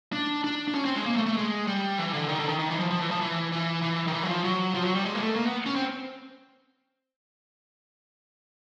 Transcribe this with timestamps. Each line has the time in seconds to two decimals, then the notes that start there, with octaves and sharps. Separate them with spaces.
0.13 D4
0.44 D4
0.68 D4
0.75 C#4
0.85 C4
0.95 G#3
1.06 A#3
1.16 A3
1.26 A3
1.37 G#3
1.67 G3
1.98 E3
2.13 D3
2.28 D#3
2.39 D3
2.49 D#3
2.59 D#3
2.70 E3
2.79 F3
2.90 F3
3.01 E3
3.11 F3
3.21 E3
3.52 E3
3.82 E3
4.07 D#3
4.13 E3
4.23 F#3
4.28 F3
4.44 F#3
4.75 F3
4.85 F#3
4.95 G3
5.05 G#3
5.15 A#3
5.20 A3
5.36 A#3
5.46 B3
5.66 C#4
5.75 C4